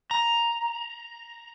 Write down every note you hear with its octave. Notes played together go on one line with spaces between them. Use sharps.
A#5